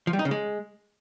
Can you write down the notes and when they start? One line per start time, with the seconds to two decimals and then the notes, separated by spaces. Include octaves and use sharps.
0.07 F3
0.13 G3
0.19 D#4
0.25 C#3
0.31 G#3